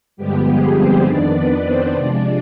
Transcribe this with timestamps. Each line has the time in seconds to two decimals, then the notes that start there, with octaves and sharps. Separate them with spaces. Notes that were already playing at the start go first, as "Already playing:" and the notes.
0.17 G2 D3 F3 G3 G#3 B3 G4
0.46 G#3 G#4
0.76 C4 C5
1.05 F2 D#3 B3 D4 D5
1.34 B3 B4
1.63 C4 C5
1.93 C3 F3 G#3 D4 D5